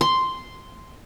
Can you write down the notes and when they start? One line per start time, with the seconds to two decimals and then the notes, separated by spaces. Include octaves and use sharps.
0.01 C6